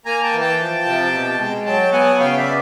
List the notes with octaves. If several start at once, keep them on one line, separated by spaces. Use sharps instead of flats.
A#3 G#5 A#5
G5 A5
E3
G5 A5
F3
C3
B2
G#3
F#3 G5 A5
B3 F#5 G#5
C#3 F5 G5
D5 E5
B3